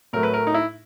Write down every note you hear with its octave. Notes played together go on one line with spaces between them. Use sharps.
A2 F#3 A3 A#4
B4
A#4
D#4
E4